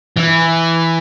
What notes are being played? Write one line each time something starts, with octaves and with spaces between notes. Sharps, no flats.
E3